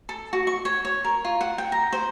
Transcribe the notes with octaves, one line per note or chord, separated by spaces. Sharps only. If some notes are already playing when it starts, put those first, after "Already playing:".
A4
F#4
C#6
C#5
C#5
A#4
F4
F#5
G5
A#5
C5